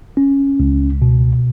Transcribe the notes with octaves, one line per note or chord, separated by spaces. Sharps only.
C#4
C#2
B2